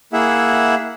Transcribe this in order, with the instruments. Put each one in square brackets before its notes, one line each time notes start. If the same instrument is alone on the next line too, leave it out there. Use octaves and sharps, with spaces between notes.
[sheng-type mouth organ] A#3 E4 G#4 E5 F#5